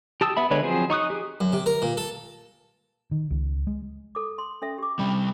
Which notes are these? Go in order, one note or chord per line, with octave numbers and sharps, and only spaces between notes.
G4 A5 D#6 E6
B3 E5 B5
D3 G#3 B4 C#5 B5
F3 F#3 C4 G#4 C5
D#4 C#6 D#6 F#6
G4 G#4
F#2
C3
A#4
A#2
A4
D#3
C#2
G#3
A4 D6
C6
C#4 A4 E5
G4 D6
C3 G3 C#4 B5